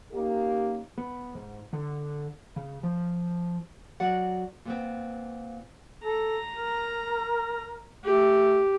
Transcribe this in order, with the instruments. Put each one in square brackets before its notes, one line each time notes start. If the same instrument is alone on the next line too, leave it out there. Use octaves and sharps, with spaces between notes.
[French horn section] A#3 C#4 D#4 F4 G4 A#4
[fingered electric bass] B3
G#2
D3
C#3
F3
[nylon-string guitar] F#3 F#4 D5 F#5
A#2 B3 C4
[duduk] A4 [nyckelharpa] A#5
[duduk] A#4
[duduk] A3 [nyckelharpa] G4